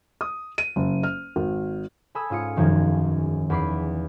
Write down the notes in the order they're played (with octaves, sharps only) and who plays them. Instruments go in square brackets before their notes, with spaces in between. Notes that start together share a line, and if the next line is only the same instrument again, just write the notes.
[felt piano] D#6
D#7
F#1
F6
G#1
[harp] A4 G#5 B5 D#6 E6
G#2 C#4 F4 D#6 C#7
E1 F#2 D#3 F3 G#3 G#6
E2 E4 B5 D6 C7